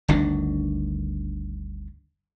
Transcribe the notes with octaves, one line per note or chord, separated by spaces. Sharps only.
G1 D2 D#3 D4